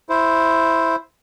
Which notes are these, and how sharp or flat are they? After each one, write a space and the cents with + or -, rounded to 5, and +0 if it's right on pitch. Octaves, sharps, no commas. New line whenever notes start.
E4 +0 C5 +0